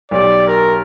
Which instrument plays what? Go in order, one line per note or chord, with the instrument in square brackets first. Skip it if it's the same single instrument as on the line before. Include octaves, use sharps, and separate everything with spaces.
[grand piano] B1 G4 [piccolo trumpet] D5
[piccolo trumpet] A#4